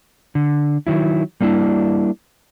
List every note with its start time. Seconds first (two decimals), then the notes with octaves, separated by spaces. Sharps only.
0.35 D3
0.87 D#3 F#3 E4
1.41 G3 A#3 D4 E4